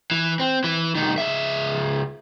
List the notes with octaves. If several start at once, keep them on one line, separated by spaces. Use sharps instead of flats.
E3
C4
E3
C2 D#3
C#2 E5